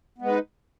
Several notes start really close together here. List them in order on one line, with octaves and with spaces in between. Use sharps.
B3 G#3 B4 D#4